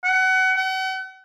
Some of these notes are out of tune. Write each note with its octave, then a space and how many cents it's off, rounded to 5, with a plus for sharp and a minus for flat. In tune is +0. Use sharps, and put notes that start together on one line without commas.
F#5 +25
F#5 +40